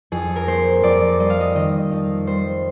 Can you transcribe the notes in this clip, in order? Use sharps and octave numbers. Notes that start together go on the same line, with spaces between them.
F2 G#4
A#4
A#3 C5
C5
F2 D5
G3 D#5
F5
D#5
D#3 D#5
F2
G3 C5